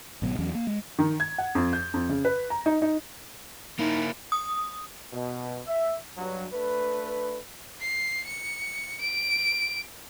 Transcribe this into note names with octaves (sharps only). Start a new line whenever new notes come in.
G#1 B2 F#3 B3
E2 E3 F#3 C#4
A#3
G#3
D#3
G#6
F#5
F2
G6
F2
C#3
B4
A#5
D#4
D#4
A#3 D#4 E4
D#6
B2
E5
G2 F#3
A3 D4 B4
C7
C#7
D7